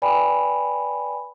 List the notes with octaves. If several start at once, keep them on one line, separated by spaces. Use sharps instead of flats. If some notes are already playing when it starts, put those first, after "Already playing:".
B4 D5 G5 G#5 B5